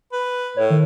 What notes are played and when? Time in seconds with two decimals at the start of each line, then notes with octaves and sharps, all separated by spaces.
0.12 B4
0.57 A2 C#5
0.70 D#3